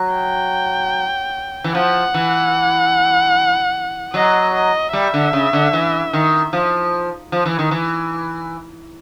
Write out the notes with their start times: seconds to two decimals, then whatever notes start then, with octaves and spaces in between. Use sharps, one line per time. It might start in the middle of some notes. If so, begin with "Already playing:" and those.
Already playing: F#3
0.15 G5
1.64 E3
1.75 F3 F#5
2.14 E3
4.14 F#3 D#5
4.54 D#5
4.93 G3 E5
5.14 D3
5.33 C#3
5.53 D3
5.73 E3
6.13 D#3
6.53 F3
7.32 F3
7.46 E3
7.59 D#3
7.71 E3